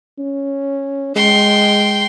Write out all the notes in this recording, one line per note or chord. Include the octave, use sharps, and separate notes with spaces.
C#4
G#3 G5 C6